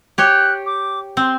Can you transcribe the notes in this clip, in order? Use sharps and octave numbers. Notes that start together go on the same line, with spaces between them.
G4 C#5 G5 F#6
D6
C4 C6